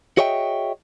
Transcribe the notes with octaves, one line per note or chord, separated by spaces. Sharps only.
F#4 G#4 C#5 D#5 E5 G5